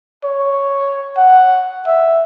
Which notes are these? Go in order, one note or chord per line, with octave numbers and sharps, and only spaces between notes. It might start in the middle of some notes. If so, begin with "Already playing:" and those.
C#5
F#5
E5